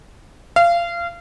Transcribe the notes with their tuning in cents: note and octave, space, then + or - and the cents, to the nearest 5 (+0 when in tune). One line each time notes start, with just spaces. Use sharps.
F5 -25